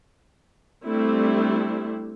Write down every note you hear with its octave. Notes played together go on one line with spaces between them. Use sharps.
G3 A3 C4 D4 E4